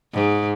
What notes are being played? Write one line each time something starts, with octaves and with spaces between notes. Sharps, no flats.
G#2